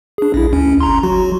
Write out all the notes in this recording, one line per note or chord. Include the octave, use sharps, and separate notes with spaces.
D4 G#4
A#1 E4
D2 C#4
G1 A#5 C6
F#3 F#4